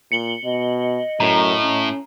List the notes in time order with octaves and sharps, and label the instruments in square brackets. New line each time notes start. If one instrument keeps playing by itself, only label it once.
[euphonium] A#2 [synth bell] C#7 F#7 G7
[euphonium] B2 [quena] D#5
[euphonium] F#2 [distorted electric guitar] A2 [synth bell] A#5
[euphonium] C#4